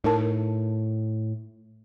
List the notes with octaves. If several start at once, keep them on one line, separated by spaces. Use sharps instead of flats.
A2 D#4 A#4 A5